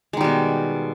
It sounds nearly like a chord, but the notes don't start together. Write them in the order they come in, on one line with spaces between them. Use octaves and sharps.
G#3 D#3 G3 B2